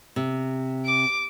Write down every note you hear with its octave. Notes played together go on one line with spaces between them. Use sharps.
C3
D6